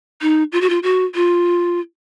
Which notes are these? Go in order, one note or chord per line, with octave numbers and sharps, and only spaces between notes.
D#4
F4
F#4
F4
F#4
F4